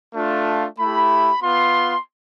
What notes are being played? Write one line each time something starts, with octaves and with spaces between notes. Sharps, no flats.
A3 D4 F4
A3 E4 G4 B5
B3 F4 C6